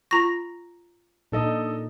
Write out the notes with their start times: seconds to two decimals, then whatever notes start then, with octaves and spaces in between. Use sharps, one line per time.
0.11 F4 A#5 C#6 A#6
1.32 A#2 D4 D#4 A4 D#5